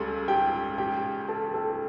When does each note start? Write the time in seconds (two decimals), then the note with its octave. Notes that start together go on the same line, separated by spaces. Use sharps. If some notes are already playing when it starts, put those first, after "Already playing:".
Already playing: C#2 C#3 G3 A4
0.28 G4 G5
0.78 G4 G5
1.28 A4 A5
1.54 A4 A5